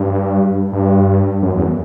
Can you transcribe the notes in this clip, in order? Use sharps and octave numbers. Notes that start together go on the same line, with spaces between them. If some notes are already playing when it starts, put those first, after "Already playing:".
Already playing: G2
G2
F#2
E2